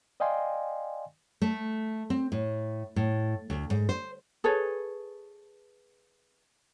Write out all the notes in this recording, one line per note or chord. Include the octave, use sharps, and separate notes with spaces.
D5 D#5 F5 G5 G#5 C6
A3
C4
A2
A2
D2
G#2
C5
G#4 A4 B4 C#5